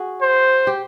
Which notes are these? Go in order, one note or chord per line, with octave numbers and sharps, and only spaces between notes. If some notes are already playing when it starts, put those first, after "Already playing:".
Already playing: F#4 G#4
C5
G4